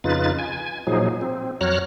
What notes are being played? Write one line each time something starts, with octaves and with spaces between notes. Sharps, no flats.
F2 C#3 D#4 F4 B4 A6
G#5
A#2 F3 F#3 D#4 G#4
C4
F2 F#3 C#5 A#5 F6 F#6